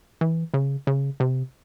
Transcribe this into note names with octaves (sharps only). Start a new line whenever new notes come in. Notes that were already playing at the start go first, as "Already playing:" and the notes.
E3
C#3
C#3
C3